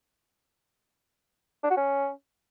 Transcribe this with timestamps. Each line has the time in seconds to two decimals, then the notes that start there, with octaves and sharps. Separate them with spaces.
1.64 D4
1.70 F#4
1.77 C#4